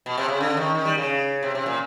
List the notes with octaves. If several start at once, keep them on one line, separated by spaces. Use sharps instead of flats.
B2
C3
C#3
D3
D#3
D#3
G3
C#3
C3
C3
A#2